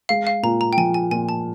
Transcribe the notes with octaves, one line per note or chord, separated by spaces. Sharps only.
G#3 F5
F5
A#2 A#5
A#5
G5
F3 G#5
G#5
A#2 G#5
A5